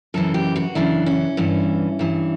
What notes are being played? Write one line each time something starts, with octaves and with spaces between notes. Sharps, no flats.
F#2 C#3 E3 A4
G4
F#4
F#2 C#3 E3 D4
C#4
G2 E3
G2 E3